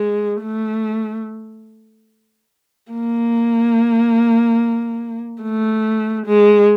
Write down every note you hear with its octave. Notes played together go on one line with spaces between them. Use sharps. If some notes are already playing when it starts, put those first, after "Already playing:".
Already playing: G#3
A3
A#3
A3
G#3